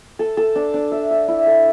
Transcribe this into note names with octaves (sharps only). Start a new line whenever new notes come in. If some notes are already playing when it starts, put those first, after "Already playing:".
A4
A4
D4
D4
E5
E5
E4
A4